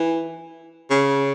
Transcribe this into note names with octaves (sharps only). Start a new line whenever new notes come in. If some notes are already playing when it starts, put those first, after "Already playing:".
Already playing: E3
C#3